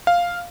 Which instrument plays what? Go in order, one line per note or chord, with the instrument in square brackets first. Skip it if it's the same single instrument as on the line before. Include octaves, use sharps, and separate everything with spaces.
[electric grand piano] F5